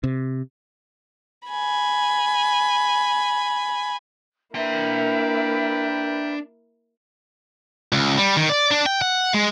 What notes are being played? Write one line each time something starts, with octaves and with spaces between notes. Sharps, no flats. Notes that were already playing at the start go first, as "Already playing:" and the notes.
C3
G#5 B5
A#3 D4 E4 A#4 B4 E5 G5 C6
C#2
G3
D#3
D5
D4
G5
F#5
G#3